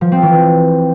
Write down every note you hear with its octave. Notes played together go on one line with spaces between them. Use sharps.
F3
C4
E3